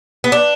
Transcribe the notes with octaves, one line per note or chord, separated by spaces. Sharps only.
B3
D4